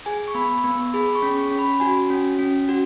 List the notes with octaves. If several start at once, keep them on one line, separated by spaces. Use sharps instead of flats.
G#4 G#5
C#6
B3 B5
B3
G#4 B5
C#6
C#4
C#6
C#4
B5
F#4 G#5
C#4
C#4
F#4